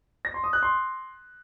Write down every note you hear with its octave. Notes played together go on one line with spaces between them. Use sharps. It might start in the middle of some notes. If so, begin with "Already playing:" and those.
A#6
C6
D#6
F#6
C6